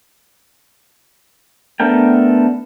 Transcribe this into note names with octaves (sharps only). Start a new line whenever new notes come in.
A3 B3 D4 A#4 G5